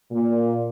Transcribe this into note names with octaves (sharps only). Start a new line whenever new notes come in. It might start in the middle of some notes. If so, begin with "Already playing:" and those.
A#2